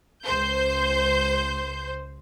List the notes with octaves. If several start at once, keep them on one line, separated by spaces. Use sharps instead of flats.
C#2 C5 G6